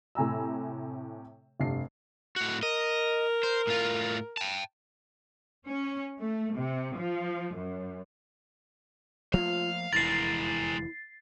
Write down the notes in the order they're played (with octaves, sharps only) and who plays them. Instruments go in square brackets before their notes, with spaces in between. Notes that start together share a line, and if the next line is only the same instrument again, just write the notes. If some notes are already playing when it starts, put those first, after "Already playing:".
[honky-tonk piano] A2 C3 G#5 A#5 E6
F1 G2 C7
[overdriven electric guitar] A2 F#4
[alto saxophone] A#4 [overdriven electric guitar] D#5
[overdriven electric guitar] C5
A2 F4
G5 A5
[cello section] C#4
A3
C3
F3
F#2
[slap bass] F3 A3 A#3 [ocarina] F4 [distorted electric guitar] F5
[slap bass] F1 E2 D3 [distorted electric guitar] G#3 A#4 [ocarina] E4 [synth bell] A6 C7